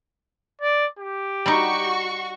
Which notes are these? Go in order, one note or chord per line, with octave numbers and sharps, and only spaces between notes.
D5
G4
G3 D#4 F#4 C#6